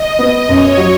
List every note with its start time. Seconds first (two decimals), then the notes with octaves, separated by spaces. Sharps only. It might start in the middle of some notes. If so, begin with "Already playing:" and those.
Already playing: D#5
0.19 B3
0.49 F#2 C#5
0.77 F#3